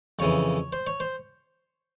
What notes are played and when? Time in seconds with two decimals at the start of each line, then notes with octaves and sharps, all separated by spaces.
0.19 F2 C#3 E3 C#5
0.73 C5
0.87 C#5
1.00 C5